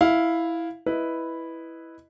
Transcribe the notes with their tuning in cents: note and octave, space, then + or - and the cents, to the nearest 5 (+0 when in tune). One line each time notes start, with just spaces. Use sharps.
E4 +0 F5 +0
E4 +0 B4 +0 D#5 +0